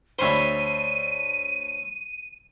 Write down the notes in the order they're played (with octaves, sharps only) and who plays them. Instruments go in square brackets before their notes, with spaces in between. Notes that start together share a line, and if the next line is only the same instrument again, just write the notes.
[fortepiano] D2 B5 [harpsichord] C5 C#5 E5 [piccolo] D#7